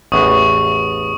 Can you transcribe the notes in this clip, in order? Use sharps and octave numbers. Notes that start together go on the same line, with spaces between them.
A1 E2 B4 C#6 D#6